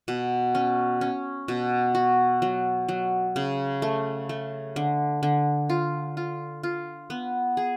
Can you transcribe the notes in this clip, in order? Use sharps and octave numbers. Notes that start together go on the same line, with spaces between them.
B2
C#4
C#4
B2
F#4
F#3
F#3
C#3
A3
A3
D3
D3
F4
F4
F4
B3
G#4